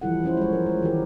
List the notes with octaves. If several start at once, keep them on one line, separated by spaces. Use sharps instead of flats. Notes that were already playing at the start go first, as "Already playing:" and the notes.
E3 F3 G3 E4 A4 F#5
F3 C#4 E4 C5
G#3 C#5
F3 A#4
G#3 C5
D#3 E3 G4 A#4